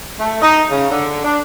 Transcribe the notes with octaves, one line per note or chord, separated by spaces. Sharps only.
A3
D#4
C#3
D3
D4